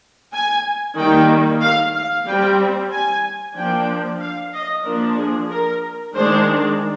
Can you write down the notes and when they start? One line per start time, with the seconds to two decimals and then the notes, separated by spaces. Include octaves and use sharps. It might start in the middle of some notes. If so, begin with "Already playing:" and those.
0.33 G#5
0.97 D#3 G3 A#3 G5
1.62 F5
1.95 F5
2.26 G3 C4 G5
2.92 G#5
3.56 F3 A#3 D4 G5
4.21 F5
4.53 D#5
4.85 F3 A#3 D4 A#4
5.18 G#4
5.50 A#4
6.15 D#3 G#3 D4 C5